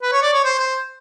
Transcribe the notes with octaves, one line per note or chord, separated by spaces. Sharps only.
B4
C#5
D5
C#5
C5
C5